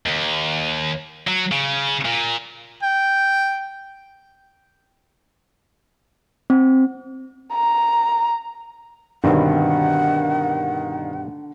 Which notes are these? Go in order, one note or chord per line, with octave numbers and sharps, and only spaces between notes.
D#2
F#3
C#3
A#2
G5
C4
A#5
G2 B2 D3 D#3 C4 F#5